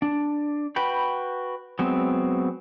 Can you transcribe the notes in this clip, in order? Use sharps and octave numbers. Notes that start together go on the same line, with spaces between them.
D4
F#4 B4 G5 B5
F#3 G#3 B3 C4